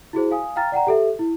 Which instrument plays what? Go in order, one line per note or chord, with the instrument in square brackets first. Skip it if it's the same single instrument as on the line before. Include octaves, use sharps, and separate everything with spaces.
[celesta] E4 F#4 G#4 C5
F5 G#5 D#6
F5 G5 A#5 F6 A6
D5 F#5 G5 A#5
G4 A4 E5
E4